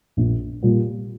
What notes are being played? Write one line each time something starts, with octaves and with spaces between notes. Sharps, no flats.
A#1
A#2 G3